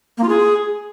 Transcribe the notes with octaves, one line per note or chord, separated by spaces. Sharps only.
A#3
F4
G#4